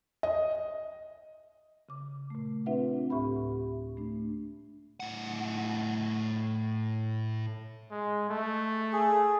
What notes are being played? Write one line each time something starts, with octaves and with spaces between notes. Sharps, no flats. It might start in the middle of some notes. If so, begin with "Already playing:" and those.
D#5
C#3 D6
A#2 A3
C4 D4 F4 B4 E5 F#5
D2 A2 G4 E5 B5
A3 D4
A2 F#5
G#3
A3
G#4